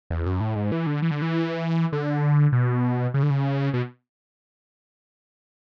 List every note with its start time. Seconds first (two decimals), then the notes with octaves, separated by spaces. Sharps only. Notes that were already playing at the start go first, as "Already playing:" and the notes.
0.10 E2
0.26 F#2
0.40 A2
0.56 G#2
0.72 E3
0.87 D3
1.02 E3
1.11 D3
1.22 E3
1.93 D3
2.52 B2
3.14 C#3
3.23 D3
3.30 C#3
3.74 B2